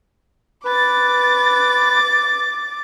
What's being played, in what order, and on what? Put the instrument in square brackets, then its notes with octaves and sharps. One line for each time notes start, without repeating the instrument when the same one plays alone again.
[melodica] B4 [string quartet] D6 A6